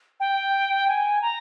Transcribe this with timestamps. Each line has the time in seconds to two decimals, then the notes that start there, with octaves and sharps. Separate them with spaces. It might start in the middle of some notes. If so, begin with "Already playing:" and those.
0.20 G5
0.88 G#5
1.22 A#5